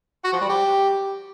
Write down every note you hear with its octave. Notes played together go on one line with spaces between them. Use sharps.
F#4
F3
G3
G4